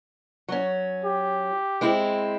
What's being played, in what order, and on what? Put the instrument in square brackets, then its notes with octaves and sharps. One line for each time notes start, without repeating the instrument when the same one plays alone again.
[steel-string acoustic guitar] F#3 C#4
[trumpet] G4
[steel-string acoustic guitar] G#3 C4 E4